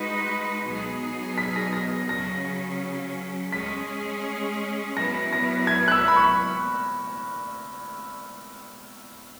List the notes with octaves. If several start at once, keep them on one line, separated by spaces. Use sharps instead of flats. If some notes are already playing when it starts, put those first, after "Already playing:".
Already playing: G#3 D#4 F#4 B4
B2 F#3 B3 D#4 G#4
B6
A#6
A#6
C#3 F#3 C#4 A#6
G#3 C#4 G#4 B6
F#3 B3 E4 B4 A#6
A#6
G#6
F#6
E6
B5
C#6